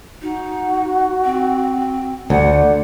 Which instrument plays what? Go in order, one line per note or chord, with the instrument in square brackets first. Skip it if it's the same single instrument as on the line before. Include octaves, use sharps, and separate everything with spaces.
[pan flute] D#4 [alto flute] F#4
[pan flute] C4
[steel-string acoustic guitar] D2 [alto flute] D5 [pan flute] F#5